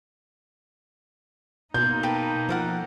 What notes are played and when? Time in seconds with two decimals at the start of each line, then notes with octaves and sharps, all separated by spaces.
1.74 B2 A#3 D#4 C6 G6
2.03 B4 G5 A5
2.49 F3 A4 A#4 F#5